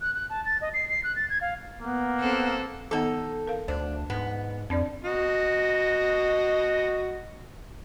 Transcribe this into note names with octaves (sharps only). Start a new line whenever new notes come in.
F#6
F#6
A5
A6
D#5
C7
C7
F#6
A6
G#6
F5
A#3 B3
C4 A4
D#3 B3 D#4 A4 F#5
A#4 F5
D2 D4 C5
G#2 B3
F2 C4 D4 D5
F#4 D#5